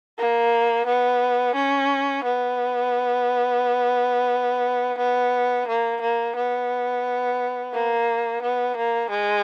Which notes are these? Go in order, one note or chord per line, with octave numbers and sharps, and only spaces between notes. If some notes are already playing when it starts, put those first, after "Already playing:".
A#3
B3
C#4
B3
B3
A#3
A#3
B3
A#3
B3
A#3
G#3